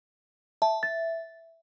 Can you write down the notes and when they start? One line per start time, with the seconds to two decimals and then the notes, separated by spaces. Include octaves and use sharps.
0.62 E5 A5
0.83 A6